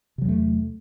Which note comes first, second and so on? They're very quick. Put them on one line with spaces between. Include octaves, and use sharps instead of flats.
C3 F#3 E2 A3